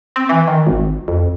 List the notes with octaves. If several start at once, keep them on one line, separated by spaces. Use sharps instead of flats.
C4
E3
D#3
G#1
F2